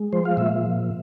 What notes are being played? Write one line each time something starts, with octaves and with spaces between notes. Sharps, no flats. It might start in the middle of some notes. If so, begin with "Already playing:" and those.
Already playing: G#3
F3 C5
F5
A#2 E5